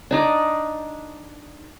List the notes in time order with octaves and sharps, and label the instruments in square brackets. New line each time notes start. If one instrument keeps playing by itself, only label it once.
[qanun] D4 D#4 D5